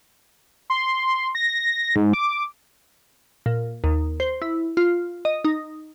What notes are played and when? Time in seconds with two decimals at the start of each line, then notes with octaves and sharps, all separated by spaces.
0.70 C6
1.35 A#6
1.96 G#2
2.13 D6
3.46 A#2
3.84 D#2
4.20 C5
4.42 E4
4.77 F4
5.25 D#5
5.45 D#4